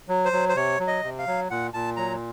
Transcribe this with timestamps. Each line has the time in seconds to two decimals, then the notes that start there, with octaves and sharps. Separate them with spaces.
0.09 F#3
0.25 C5
0.33 F#3
0.49 C5
0.55 C3 C#5
0.80 F#3
0.87 D#5
1.03 C3
1.19 F5
1.27 F#3
1.50 A#2 F#5
1.74 A#2 A5
1.96 F#3 A#5